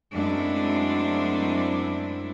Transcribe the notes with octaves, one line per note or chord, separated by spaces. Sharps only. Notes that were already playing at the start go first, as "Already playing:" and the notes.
F#2 G#3 A3 C4 D4 E4